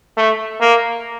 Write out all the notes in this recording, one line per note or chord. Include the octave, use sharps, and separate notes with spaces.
A3
A#3